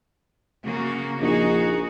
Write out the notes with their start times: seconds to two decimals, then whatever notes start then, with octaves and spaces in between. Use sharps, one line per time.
0.63 C#3 A#3 F#4
1.21 A#1 D#4 F#4 G#4